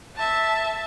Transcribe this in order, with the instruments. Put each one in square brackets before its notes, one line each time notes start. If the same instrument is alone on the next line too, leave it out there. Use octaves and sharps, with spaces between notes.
[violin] E5 A5